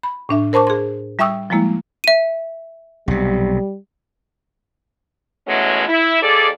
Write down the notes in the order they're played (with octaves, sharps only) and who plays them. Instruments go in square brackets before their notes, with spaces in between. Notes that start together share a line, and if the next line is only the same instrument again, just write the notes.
[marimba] B5
A2 D4 E5
A#4 C5 A5 C#6 D6
G#4 C6
G3 E5 G5 C#6 D#6 E6
F3 G3 G#3 A#3 E4
[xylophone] E5 D#7
[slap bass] B1 C3 [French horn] G3
[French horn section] B2 E3 F#3 G#3 A3 C#4
E4
D#2 G#4 A4 D5